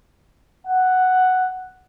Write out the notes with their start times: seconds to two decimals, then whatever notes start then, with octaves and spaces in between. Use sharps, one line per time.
0.66 F#5